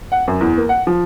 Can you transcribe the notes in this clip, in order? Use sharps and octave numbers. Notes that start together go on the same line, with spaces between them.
F#5
F#2
E2
A#3
F#5
F3